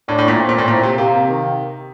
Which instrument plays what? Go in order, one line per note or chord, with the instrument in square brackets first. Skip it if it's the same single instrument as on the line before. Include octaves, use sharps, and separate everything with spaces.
[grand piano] A2 [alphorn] D4
[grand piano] A2
A#2
[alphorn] C4
[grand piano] A#2
A2
[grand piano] A#2 [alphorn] C4
[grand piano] C3
[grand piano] C3 [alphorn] A#3
[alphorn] D#3